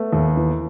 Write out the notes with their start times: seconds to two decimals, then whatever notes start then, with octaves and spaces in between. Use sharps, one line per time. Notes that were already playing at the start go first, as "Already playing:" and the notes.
Already playing: A3 B3
0.13 D#2
0.37 E3